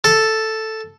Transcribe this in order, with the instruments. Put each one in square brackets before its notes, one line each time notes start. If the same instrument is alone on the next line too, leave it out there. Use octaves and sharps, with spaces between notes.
[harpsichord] A4